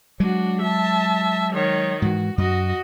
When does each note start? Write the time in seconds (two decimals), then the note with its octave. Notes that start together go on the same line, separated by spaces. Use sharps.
0.20 F#3 G#3 D4 F#4
0.61 E5 A5
1.53 D#3 C#5
2.02 G#2 E3 F#4
2.38 F#2 F#4 D#5